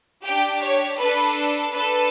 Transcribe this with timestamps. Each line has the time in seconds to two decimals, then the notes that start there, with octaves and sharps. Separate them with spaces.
0.24 D4 G4 G5
0.61 C#5
0.98 D4 A4 B4
1.73 D4 A4 B4